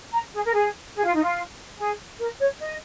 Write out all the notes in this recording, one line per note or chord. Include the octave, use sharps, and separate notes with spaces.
A#5
G#4
A#4
G#4
G#4
F4
D#4
F4
G#4
A#4
C#5
D#5